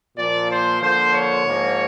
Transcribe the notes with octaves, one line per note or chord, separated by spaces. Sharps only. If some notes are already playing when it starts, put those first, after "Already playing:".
A#2 F3 A#3 D5
C5
D3 F3 A#3 C5
C#5
G#2 F3 A#3